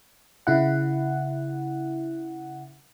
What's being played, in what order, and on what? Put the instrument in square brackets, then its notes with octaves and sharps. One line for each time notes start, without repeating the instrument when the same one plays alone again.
[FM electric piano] C#3 E4 F#5